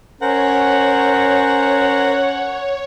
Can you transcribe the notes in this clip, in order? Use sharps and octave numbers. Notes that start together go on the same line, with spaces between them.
C#4 A#4 C5 C#5 F#5